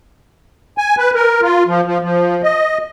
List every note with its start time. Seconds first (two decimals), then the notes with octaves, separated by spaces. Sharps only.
0.78 G#5
0.98 B4
1.15 A#4
1.42 F4
1.67 F3
1.85 F3
2.02 F3
2.43 D#5